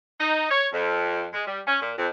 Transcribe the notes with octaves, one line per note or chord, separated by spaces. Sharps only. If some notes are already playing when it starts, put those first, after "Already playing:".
D#4
C#5
F2
G#3
G3
C#4
A#2
F2